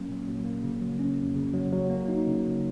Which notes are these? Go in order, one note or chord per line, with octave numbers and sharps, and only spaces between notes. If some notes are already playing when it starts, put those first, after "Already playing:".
Already playing: F#3 A#3 C#4
A#2
F#3
A#3
C#3
F#3
C#4
F2
C#3
F#3
F#3
A#3
D#4
C#3
F#3